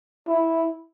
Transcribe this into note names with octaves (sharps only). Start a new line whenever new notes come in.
E4